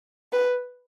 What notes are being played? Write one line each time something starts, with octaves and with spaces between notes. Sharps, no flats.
B4